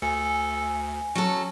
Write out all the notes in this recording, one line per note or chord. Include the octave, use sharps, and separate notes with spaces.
D2 A4 G#5
F#3 C#4 A4